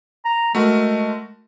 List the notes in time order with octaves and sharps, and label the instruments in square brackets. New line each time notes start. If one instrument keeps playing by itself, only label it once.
[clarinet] A#5
[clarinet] G#3 [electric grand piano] A3 F#4 A#4